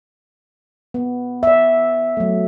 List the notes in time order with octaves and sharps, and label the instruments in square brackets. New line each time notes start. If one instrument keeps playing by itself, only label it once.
[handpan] B3
D5 E5
F#3 A3